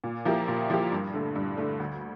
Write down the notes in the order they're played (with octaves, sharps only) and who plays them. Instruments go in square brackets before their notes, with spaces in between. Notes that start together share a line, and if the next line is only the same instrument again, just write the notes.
[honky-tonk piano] A#2
F3 A#3 E4 G4
A#2
F3 A#3 E4 G4
G2
D3 A3
G2
D3 A3
D2